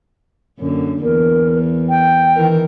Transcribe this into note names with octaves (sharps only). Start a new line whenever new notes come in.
F#2 D3 A#3
E2 A#4
G5
D#3 E3 A#4